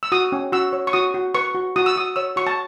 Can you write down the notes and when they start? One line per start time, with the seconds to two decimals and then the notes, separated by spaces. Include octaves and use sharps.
0.03 E6
0.12 F#4 D#6
0.32 C#4
0.52 F#4 E6
0.73 C#5
0.87 C#6
0.93 F#4 D#6
1.14 F#4
1.35 B4 C#6
1.55 F#4
1.76 F#4 D#6
1.86 E6
1.96 F#4 D#6
2.16 C#5 E6
2.36 F#4 C#6
2.47 A5